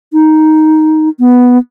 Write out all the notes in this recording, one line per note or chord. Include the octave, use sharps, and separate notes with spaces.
D#4
B3